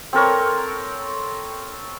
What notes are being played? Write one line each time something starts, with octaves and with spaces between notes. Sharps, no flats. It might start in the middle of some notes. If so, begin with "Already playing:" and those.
C4 A4 A#4 C#5